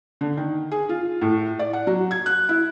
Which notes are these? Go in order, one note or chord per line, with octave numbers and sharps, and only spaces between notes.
D3
D#3
G#4
F4
A2
D5
F#5
F#3
G#6
F#6
E4